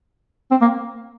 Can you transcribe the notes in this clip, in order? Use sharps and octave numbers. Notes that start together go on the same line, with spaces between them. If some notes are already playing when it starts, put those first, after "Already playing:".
C4
A#3